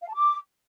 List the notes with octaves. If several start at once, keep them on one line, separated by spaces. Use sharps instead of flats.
F5
A5
D6